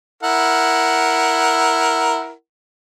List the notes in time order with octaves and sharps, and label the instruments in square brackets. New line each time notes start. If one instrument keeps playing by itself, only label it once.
[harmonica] E4 A#4 F#5